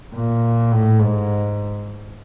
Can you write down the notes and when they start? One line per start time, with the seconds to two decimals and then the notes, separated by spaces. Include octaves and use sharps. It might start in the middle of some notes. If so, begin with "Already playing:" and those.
0.15 A#2
0.72 A2
1.00 G#2